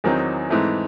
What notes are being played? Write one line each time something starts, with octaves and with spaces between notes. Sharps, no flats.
E2 D#3 F#3 C4 D#4
G#2 E3 A3 C4